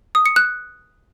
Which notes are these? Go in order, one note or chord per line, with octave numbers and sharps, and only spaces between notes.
D#6
C#7
F#6